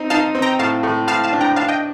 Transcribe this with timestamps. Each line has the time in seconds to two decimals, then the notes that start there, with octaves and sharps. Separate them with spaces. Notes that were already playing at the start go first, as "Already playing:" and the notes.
Already playing: C4 D#4
0.10 D#4 F5 A5
0.35 C4
0.42 G5 A#5
0.59 A2 F5 A5
0.83 A2
1.07 A2 F5 A5
1.24 F5 A5
1.33 D4
1.41 G5 A#5
1.56 D4 F5 A5
1.68 D#5 G5